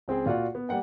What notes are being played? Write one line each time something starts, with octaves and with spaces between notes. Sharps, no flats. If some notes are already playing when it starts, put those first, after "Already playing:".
C#2 C4 G#4 G5
A#2 F4 F#4 D5 F#5
B3
G3 A#3 F#5 G5